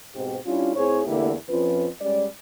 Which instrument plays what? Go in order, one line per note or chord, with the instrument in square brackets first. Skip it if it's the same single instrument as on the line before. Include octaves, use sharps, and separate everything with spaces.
[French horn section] G#2 B2 C4 G4
G3 C#4 D4 E4 F4
A2 C4 E4 G#4 C5 C#5
E2 D3 A3 A#3 E4 G4
F2 F3 C#4 F4 B4
G3 G#3 C#4 D5